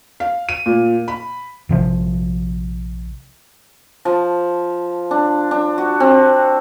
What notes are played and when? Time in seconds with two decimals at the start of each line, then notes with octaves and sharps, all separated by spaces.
0.20 F5
0.49 D#7
0.66 A#2
1.08 B5
1.69 A#1 C3 F3
4.05 F3
5.11 D4
5.51 D4
5.78 F#4
6.00 C4